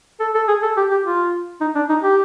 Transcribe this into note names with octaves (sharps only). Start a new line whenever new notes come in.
A4
A4
G#4
A4
G4
G4
F4
D#4
D4
D#4
G4